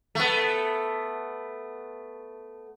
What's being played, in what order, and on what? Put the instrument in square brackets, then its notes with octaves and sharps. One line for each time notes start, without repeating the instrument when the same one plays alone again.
[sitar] A3 B3